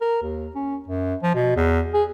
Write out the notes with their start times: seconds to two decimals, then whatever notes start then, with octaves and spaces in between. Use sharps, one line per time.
0.01 A#4
0.22 D#2
0.55 C#4
0.88 F#2
1.23 F3
1.35 B2
1.56 E2
1.94 G#4